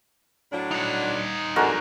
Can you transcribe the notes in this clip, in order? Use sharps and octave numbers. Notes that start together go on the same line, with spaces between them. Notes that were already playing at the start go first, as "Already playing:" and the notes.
A2 F#3 D4
D#4 F#5
F2 D3 G#3 F#4 A#4